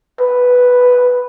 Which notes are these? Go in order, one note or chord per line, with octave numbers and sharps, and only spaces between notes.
B4